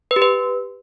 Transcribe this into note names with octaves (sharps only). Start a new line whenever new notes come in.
B4
G4
B4